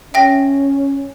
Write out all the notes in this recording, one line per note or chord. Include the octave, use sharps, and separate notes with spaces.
C#4 E5 G5 A#6